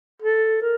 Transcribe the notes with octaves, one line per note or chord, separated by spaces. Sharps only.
A4
A#4